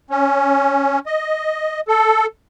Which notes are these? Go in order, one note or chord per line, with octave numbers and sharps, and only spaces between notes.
C#4
D#5
A4